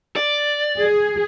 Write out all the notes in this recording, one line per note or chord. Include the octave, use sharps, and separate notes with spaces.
D5
G#4